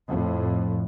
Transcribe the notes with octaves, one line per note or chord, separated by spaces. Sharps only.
F2 A2